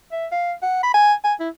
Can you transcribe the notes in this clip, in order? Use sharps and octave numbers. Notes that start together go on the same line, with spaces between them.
E5
F5
F#5
B5
G#5
G#5
E4